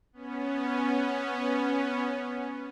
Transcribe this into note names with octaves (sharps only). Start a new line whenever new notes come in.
B3 C#4